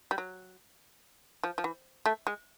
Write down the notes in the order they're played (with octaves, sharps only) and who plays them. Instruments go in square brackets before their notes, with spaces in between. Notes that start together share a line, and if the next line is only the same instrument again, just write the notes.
[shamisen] G3
F#3
F3
F3
E3
A3
G#3